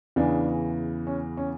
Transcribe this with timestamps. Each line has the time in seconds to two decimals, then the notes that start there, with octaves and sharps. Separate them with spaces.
0.16 E2 C#3 E3 D4
1.07 C#4
1.37 C#4